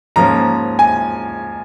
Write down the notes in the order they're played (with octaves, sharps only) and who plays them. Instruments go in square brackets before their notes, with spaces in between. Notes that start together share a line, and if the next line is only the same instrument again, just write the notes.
[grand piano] G#2 F3 A#3 C#4 A#5
G#5